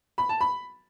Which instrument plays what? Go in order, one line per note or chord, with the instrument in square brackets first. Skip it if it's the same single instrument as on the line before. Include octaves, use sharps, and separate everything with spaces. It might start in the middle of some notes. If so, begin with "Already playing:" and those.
[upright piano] B5
A5
B5